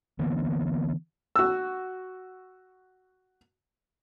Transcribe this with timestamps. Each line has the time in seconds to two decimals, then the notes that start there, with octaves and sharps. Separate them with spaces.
0.19 D3 E3 A#3 B3
1.36 F#4 E6